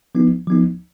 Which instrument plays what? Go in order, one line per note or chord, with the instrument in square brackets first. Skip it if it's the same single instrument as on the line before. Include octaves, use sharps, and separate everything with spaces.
[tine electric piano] F3 B3 D#4
F3 B3 D#4